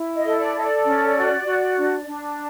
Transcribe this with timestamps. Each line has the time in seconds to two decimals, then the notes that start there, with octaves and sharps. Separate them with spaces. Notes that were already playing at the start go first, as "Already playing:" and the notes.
Already playing: E4
0.17 D#5
0.24 A4
0.39 D5
0.55 A4 D#5
0.62 D5
0.85 C#4
1.16 F#4
1.46 F#4
1.76 D4
2.06 D4